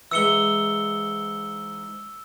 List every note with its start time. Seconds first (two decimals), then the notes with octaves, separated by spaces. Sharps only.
0.11 G#2 E3 E6 C#7 G7